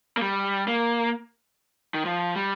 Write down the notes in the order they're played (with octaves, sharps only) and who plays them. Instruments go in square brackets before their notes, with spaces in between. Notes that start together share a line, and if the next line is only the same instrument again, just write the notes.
[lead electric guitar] A#3
G3
A#3
D#3
F3
G3